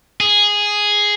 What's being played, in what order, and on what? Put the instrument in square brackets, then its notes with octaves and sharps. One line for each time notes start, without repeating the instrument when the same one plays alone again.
[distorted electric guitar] G#4